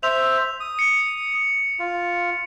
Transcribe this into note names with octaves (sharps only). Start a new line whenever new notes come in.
C5 E5 F7
D#6
C#7
F4